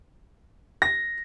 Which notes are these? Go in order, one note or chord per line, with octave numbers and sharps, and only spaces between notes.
A#6